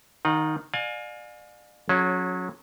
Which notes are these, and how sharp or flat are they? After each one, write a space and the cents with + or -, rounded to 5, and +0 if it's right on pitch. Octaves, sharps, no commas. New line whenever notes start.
D#3 +0 D#5 -25 F#5 -45
D5 +40 F5 +30 G#5 +15
F#3 -25 C#4 -5 G#4 +40